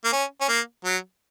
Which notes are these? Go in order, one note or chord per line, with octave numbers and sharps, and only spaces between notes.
A#3
C#4
C#4
A#3
F#3